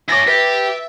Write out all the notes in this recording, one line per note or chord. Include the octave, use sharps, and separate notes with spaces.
E4 C#5 G#5 D6 A6 A#6
G4 B4 E5